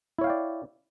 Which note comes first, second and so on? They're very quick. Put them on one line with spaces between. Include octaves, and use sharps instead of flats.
E4 C#5 F5 G5 D5